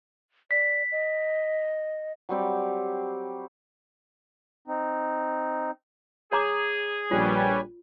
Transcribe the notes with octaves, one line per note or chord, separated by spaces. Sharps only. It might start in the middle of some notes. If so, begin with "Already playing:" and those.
D5 B6
D#5
F#3 G3 C4 G4
C4 D#4
G#4 C#5 A#5 D6
A#1 G3 F4 B4 C#5 G#5